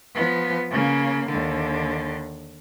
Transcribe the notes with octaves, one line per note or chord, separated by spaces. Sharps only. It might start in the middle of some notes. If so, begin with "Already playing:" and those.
F3 B3
C#3 A#3
D#2 D3